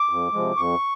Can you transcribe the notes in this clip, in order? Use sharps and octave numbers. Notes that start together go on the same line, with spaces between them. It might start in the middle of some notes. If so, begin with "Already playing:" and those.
Already playing: D6
F2
C3 F3 G#3
F2 C#6